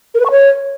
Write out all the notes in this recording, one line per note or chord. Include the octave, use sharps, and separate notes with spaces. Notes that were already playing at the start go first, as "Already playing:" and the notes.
A#4
B4
C#6
C#5